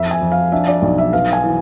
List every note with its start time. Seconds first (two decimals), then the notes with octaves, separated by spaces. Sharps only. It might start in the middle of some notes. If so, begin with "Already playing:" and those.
Already playing: F2 E5
0.11 G#5
0.21 F2
0.32 F5
0.52 D4 E5
0.68 D5
0.82 B1
0.98 E5
1.13 B3 F5
1.33 G#5
1.44 E3